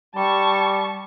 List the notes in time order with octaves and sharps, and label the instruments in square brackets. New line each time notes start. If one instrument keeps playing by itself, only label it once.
[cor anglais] G3 [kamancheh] A5 C#6